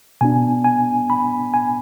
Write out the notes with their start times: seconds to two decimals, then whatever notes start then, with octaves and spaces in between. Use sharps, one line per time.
0.21 B2 B3 D4 G#5
0.64 G#5
1.10 B5
1.54 G#5